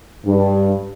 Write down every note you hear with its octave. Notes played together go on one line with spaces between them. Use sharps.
G2